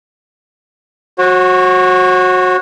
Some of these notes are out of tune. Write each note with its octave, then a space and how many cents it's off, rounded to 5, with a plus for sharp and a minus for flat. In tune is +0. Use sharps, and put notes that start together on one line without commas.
F#4 -10 C#5 -45